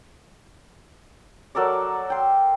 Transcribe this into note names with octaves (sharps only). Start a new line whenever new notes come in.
F#3 A4 A#4 D5
G5 C6